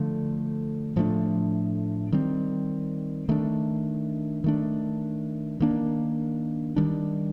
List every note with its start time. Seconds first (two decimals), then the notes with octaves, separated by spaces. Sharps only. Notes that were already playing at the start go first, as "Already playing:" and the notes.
Already playing: D3 F3 A3
0.96 A2 F3 A3 D4
2.12 D#3 G3 C4
3.29 D#3 A3 D4
4.44 D#3 A3 D4
5.60 D#3 A#3 D4
6.76 D#3 G3 D4